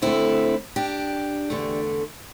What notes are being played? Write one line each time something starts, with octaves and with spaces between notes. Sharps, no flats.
D2 D3 A3 C4 E4
D4 G4
E2 D3 A3